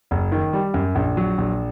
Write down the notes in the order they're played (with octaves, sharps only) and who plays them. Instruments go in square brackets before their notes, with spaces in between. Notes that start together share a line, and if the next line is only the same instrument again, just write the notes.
[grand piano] F#1
D#3
G3
F#2
A#1
F#3
A#1